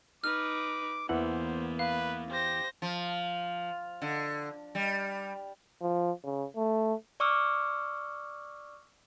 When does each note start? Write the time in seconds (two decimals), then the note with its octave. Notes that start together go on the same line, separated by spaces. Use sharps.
0.24 D#4 B4 D6 F6
1.09 E2 E3 A#3 B3 C5 F#5
1.79 B4 F5
2.31 G4 C5 A#6
2.82 F3
4.02 D3
4.75 G3
5.81 F3
6.24 C#3
6.56 A3
7.20 D5 C#6 D6 E6 F6